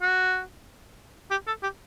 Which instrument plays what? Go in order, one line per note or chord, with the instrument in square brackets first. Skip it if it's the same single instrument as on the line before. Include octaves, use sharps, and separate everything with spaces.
[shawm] F#4
G4
A4
G4